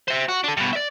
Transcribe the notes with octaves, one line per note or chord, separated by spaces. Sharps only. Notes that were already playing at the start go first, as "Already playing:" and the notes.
C5 E5
F#4
D4 A4
G2 B2
D5 E5